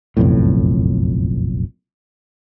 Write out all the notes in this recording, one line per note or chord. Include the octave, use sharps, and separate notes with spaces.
F#1 B1 F2 A2